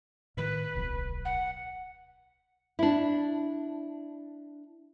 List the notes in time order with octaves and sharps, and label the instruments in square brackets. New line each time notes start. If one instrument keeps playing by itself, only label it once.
[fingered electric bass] A2 D#3 [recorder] B4
[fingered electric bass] D1 B1 F#3
[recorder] F#5
[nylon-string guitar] D4 E4